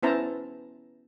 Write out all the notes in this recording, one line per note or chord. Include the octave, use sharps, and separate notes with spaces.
B3 C#4 E4 C5 A5 A#5